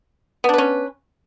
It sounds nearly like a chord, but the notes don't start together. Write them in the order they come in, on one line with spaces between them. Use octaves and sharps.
B3 D4 B4 C#4